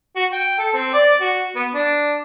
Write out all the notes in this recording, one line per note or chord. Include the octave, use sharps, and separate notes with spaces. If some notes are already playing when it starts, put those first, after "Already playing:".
F#4
G5
A4
C4
D5
F#4
B3
D4